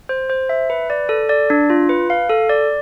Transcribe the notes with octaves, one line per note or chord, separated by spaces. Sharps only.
C5
C5
E5
B4
D5
A4
D5
D4
F4
B4
F5
A4
D5